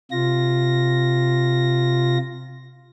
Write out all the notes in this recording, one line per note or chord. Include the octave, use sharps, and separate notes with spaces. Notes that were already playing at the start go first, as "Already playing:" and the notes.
C3 F4 A#6